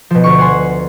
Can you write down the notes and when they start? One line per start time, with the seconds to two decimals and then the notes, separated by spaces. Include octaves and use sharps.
0.10 B2 F3
0.24 D2 C#6
0.38 F#5 G#5 C6